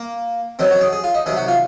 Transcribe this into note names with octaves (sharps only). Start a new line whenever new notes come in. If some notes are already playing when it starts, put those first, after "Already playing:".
Already playing: A#3
F#2 D#3 F#3 C4
F#4
G#4
G#4
F4
D#4
C3 D#3 F#3 G#4
F#4
F4